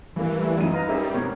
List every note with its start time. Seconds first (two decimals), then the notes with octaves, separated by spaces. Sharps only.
0.16 G2 E3 A#3
0.39 G3 A3
0.58 F#2 D#4 D#7
0.74 B4 F5 A#5
0.89 G3 C#4 G#4 A#4 C#5 E5
1.14 B2 C4 A#4 C#5